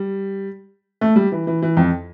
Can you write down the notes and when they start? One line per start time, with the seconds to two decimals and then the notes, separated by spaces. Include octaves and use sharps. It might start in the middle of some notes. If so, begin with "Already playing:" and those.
Already playing: G3
1.01 A3
1.16 G3
1.32 E3
1.47 E3
1.62 E3
1.77 F2